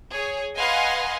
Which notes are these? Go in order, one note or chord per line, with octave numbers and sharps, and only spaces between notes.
G#4 C#5
B4 D#5 F5 F#5 G#5 C6